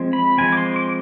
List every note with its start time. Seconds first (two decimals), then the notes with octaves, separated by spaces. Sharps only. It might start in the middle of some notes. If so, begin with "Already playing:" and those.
Already playing: F3 G#3 C4
0.13 B5
0.38 F3 G#3 C4 G#5
0.52 D6
0.57 C6
0.76 D6